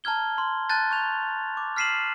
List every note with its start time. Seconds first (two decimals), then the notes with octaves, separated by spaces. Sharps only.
0.04 A5 A#5 F6 G#6 G7
0.38 C6
0.70 A5 F#6 G6 A6
0.91 C#6 G6 F7
1.57 D6
1.76 F6 B6 C7 D#7 E7 F#7